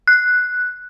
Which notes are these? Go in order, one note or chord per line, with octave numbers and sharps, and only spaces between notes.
F#6